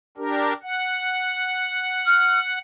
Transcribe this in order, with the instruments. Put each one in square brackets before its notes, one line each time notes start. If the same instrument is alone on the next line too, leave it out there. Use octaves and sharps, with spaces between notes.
[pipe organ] D4 G4 A#4
F#5
[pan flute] F6